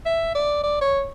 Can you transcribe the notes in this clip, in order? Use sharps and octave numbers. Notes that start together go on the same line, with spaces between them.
E5
D5
D5
C#5